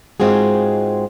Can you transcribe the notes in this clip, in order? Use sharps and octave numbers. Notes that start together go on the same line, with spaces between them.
G#2 G#3 C4 F4 F#4 G#4